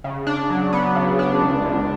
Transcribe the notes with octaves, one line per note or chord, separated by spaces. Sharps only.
C#3
D4
F#3
B3
C#3
D4
C#2
C#2